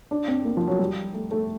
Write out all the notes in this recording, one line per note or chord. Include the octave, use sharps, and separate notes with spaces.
D4
C4
A#3
F3
F#3
G3
A3
A3